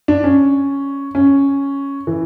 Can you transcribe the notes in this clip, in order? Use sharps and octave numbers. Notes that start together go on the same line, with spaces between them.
D4
C#4
C#4
E3